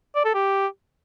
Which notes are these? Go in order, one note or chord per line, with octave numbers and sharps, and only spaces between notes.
D5
A4
G4